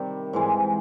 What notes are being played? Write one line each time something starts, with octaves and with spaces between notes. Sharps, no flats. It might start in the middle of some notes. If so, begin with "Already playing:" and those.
Already playing: C3 D#3 G3
G#2 E3 G#3